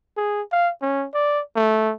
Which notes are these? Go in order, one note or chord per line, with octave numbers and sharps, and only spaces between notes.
G#4
F5
C#4
D5
A3